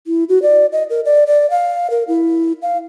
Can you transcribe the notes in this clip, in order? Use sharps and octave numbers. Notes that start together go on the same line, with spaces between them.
E4
F#4
D5
D#5
A#4
D5
D5
F5
A#4
E4
F5